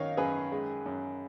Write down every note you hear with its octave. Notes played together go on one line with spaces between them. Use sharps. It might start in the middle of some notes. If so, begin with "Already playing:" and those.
Already playing: F#2 D#3 C#5 D#5 F5
F#2 G#4 B4
G#3
F#2